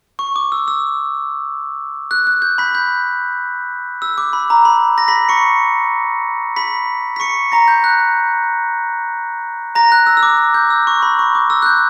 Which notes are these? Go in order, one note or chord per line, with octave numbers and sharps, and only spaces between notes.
C#6
D6
E6
E6
F#6
F#6
G6
B5 B6
G6
E6
D6
B5
A#5
B5
A#6
B5 B6
C#6 C#7
B5 B6
B6
C#6 C#7
A#5 A#6
G6
F#6
A#5 A#6
F#6
E6
E6
D6
G6
E6
C#6
B5
C#6
D6
E6
F#6
G6